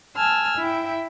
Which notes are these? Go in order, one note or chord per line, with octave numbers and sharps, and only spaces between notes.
G#5 A5 E6 F6
E4 E5 G5